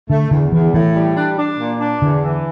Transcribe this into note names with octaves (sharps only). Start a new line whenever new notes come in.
D3 A3
E2 D3
E2 E3
A2 E3
G3
D4
D4
A#2
D4
E2 D3
E3